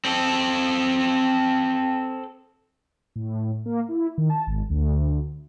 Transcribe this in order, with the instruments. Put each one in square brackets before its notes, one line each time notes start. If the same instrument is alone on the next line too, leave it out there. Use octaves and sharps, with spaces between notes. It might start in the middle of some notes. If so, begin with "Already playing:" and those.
[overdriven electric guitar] C4 A4
[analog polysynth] A2
A#3
E4
D#3
A5
G#1
D2